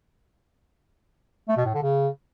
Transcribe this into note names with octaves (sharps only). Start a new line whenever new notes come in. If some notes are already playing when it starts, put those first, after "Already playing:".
A3
B2
A2
D3
C#3